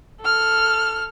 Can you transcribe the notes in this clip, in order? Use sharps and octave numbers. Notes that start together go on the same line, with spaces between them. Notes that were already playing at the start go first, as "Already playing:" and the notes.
A4 F6